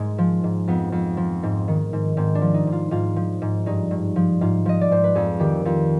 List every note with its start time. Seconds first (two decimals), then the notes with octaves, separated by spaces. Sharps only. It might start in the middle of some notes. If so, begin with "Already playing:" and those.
Already playing: G#2 G#3
0.18 F3
0.44 G#2
0.68 F2 B3
0.92 F2
1.17 F3
1.43 G#2
1.68 D#3
1.93 G#2
2.17 G#2 C4
2.35 D4
2.42 F3
2.54 D#4
2.67 G#2
2.73 F4
2.91 G#2 F4
3.16 F3
3.42 G#2
3.66 G2 D#4
3.91 G2
4.16 F3
4.41 G#2 F4
4.66 F3 D#5
4.81 D5
4.91 G#2 C5
5.04 B4
5.15 F2 G#4
5.39 D#3 G4
5.65 F2 F4